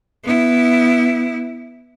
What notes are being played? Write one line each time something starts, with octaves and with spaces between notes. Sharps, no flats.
B3 E4